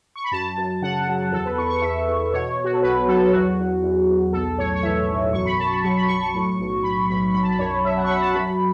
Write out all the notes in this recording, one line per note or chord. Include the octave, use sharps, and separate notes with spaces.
C#6
B5
F#2 A5
F#2
C#3 F#5
F#3
E2 A4
B4
E2 C#6
C#6
E2 E5
E2
B2 C#5
B2
F#4
A4
B1 B4
F#3 A4
A4
E2 F#4
E2
E2
E2
B1 A4
A2 C#5
C#5
E3 E5
B1
F#2 C#6
B5
F#2 A5
B5
F#3 C#6
B5
F#3 C#6
C#6
A2
B1
B1 B5
B1 B5
F#3 B5
A5
B5
F#2 C#5
F#3 E5
F#5
C#6
F#3 B5
F#5
A5
F#2 B5